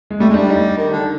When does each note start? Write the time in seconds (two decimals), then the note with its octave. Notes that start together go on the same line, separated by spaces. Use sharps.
0.11 G#3
0.20 G3 A3
0.29 G#3
0.34 G3 D4
0.49 D#4
0.77 D#3
0.92 D3